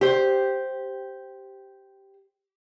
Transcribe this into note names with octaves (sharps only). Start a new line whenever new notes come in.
G4 C5